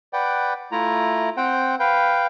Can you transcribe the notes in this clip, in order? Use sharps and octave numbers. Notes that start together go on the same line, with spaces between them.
B4 D5 F#5 G5
A3 E4 F4 A#5
C4 C5 F#5 G5
B4 F5 G5